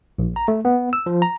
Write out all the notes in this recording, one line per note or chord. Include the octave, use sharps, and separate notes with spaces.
A#1
A#5
A3
B3
E6
F3
A#5